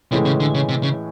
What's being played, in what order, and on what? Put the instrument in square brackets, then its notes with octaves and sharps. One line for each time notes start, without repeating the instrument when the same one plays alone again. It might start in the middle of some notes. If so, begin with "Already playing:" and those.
[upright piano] A2 E3 G#3 C#4 [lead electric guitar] C3
[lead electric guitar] C#3
D3
C#3
C3
C#3